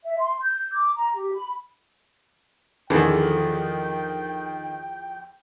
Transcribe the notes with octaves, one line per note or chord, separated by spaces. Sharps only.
E5
C6
G6
D6
A#5
G4
B5
E2 D3 D#3 F3 G#4 A4 G5